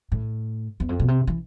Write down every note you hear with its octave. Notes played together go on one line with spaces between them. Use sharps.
A2
E2
F2
B2
C3
E3